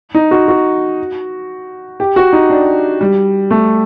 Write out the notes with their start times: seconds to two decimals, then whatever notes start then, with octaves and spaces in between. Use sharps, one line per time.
0.15 D#4
0.31 F#4
0.48 F#4
2.00 G4
2.16 F#4
2.33 D#4
2.50 D4
3.01 G3
3.51 A3